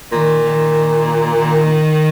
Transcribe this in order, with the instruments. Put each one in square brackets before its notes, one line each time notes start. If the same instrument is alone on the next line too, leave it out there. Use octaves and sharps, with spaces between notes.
[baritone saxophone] A#2 [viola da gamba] D#3
[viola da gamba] D#3
D#3